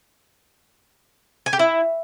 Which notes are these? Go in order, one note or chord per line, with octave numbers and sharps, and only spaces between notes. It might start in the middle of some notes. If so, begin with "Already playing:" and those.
G#5
G4
E4